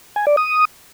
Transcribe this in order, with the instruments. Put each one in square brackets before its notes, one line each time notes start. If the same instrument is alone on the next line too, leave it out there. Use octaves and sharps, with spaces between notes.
[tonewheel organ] G#5
D5
D#6